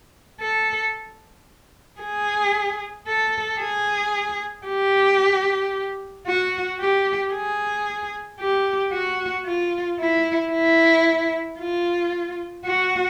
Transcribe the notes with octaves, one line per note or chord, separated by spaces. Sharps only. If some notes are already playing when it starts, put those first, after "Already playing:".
A4
G#4
A4
G#4
G4
F#4
G4
G#4
G4
F#4
F4
E4
E4
F4
F#4